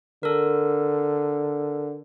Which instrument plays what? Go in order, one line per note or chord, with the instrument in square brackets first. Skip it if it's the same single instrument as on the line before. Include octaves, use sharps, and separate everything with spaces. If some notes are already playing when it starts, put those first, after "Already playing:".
[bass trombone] D3 [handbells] A4 A#4